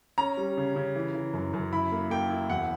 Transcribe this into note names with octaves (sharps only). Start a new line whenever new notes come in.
C#4 A#5
G3
C#3
C#3
E3
E3
F#2
F#2
E4 B5
A#3
A#3 G5
E4
E1 F#5